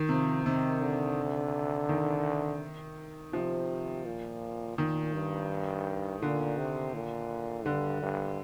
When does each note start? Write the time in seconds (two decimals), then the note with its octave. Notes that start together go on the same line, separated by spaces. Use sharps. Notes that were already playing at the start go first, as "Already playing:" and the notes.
Already playing: D#3
0.09 C3 F3
0.45 C3 D#3
0.82 D3
1.89 D#3
3.33 C3 F3
4.06 A#2
4.77 A#2 D#3
5.14 G2
6.22 A#2 D3
6.58 C3
6.94 A#2
7.66 G2 D3
8.02 G2